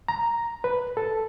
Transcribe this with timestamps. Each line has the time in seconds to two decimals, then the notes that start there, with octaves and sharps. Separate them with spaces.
0.08 A#5
0.64 B4
0.97 A4